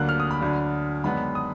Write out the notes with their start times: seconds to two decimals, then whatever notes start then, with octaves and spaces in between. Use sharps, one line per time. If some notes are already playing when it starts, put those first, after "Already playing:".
Already playing: D2 D3 F#3 A#3 D4 F#6
0.09 F6
0.20 D#6
0.31 B5
0.41 D2 D3 F#3 D4
1.04 F#2 D#3 G#3 B3 D4 B5
1.35 D#6